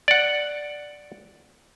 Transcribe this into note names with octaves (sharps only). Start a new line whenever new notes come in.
D5 F#5